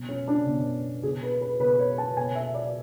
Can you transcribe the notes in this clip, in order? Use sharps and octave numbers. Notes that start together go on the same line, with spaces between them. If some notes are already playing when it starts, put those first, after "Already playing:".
Already playing: B2
C#4
D4
B2
B2 G#4
B4
B4
B2 B4
C#5
A5
B2 G#5
E5
D5